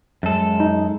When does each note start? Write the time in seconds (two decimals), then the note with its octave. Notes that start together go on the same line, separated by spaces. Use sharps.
0.23 F#2 G#3 A4
0.60 D#4